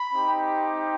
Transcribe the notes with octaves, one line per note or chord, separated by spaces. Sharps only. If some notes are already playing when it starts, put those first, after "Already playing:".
Already playing: B5
C4 D#4 G4